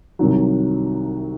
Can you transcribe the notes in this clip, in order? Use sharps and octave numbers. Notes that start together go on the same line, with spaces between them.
C2 C3 D#3 F#3